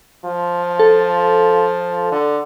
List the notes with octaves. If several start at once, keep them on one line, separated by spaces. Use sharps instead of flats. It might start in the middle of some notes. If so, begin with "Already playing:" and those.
F3
A4
D3